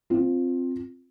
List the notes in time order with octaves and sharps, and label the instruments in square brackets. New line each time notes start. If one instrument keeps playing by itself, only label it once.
[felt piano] C4 F4